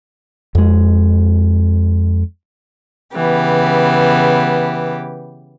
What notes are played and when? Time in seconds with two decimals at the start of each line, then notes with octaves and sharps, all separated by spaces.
0.55 F2 G#3
3.15 C#3 E3 B3 G4